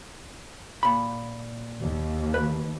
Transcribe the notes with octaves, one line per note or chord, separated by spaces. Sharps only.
A#2 B5
D#2
B4